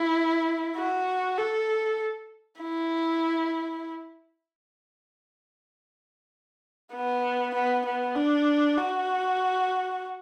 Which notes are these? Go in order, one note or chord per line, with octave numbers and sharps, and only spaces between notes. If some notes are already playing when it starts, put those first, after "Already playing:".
Already playing: E4
F#4
A4
E4
B3
B3
B3
D4
F#4